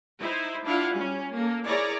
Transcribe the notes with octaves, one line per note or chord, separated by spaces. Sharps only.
D#4 E4 C5
D4 E4 F4 F5 F#5
G3 C#4
A#3 A4
E4 G#4 A#4 C#5 D5 A#5